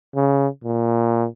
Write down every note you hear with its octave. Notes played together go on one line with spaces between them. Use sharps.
C#3
A#2